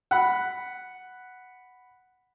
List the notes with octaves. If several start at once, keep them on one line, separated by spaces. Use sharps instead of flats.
F#5 B5